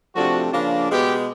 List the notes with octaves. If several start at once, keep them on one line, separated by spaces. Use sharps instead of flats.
C3 F3 A3 D4 F#4
C#3 F3 A#3 D4
B2 G#3 B3 G4